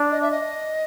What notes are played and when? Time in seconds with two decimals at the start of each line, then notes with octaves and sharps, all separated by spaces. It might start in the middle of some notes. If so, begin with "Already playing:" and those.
Already playing: D4
0.11 D#5
0.22 E5
0.32 D#5